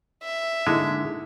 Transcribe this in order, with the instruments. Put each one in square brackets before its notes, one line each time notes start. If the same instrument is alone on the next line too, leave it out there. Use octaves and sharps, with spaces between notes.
[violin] E5
[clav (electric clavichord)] D3 G#3 [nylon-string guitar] A#3 D#4 E4